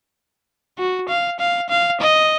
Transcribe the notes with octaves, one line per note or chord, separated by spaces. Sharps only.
F#4
F5
F5
F5
D#5